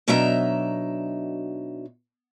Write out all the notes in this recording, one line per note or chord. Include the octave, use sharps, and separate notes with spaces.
B2 F#3 D4 D#4 E5 A#5